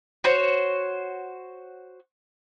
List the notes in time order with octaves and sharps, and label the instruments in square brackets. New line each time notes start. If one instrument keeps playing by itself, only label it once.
[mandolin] F#4 C5 C#5